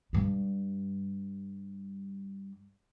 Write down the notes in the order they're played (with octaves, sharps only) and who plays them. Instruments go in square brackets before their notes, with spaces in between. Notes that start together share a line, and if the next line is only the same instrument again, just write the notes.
[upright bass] G2 G3